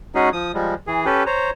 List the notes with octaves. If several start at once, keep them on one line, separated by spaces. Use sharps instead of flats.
G#3 C#4 D#4 F#4 G#4
F3 D#6
F3 G3 G#3
E3 G#4
C#4 G4 A4 B4
C5 C#5 A#5